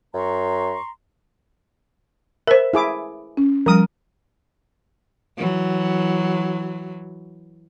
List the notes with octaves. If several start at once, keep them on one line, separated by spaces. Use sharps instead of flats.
F#2 A#5 C6 C#6
A#4 C5 E5
E4 G#4 D6
C#4
F3 G3 A#4 D#6
E3 F#3